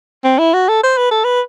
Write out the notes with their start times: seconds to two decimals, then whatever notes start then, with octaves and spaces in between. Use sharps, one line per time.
0.24 C4
0.39 E4
0.54 F#4
0.69 A4
0.83 C5
0.97 B4
1.11 A4
1.24 B4